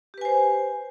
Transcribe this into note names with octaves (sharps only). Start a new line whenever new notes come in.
G4 B4 C5 G#5